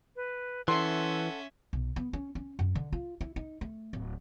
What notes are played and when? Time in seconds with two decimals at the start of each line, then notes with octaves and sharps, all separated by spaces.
0.16 B4
0.68 E3 C#4 A4 E5 F#5 C6
1.73 B1
1.96 B3
2.13 C#4
2.35 C#4
2.59 F#2
2.75 D3
2.92 F4
3.21 E4
3.36 D#4
3.61 A3
3.93 D1